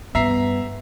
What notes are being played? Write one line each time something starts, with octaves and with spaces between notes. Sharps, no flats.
G2 B3 E5 A#5 C7